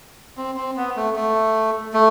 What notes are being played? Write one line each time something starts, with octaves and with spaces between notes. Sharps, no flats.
C4
C4
B3
A3
A3
A3